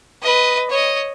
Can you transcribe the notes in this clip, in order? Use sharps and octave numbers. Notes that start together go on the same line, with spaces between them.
B4 D#5
C#5 D#5